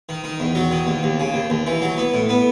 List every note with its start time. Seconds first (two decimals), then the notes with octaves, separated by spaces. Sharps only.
0.09 D#3
0.24 D#3
0.40 E2
0.55 F#3
0.71 D#3
0.87 D#2
1.03 D#2
1.19 C#3
1.34 D#2
1.50 D#2
1.67 E3
1.82 F#3
1.98 B3
2.14 A2
2.29 B3